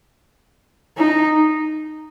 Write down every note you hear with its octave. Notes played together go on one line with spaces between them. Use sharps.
D#4